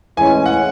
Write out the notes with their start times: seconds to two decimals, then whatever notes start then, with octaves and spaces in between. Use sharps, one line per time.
0.17 A2 E3 G#3 C#4 G#5
0.46 F#5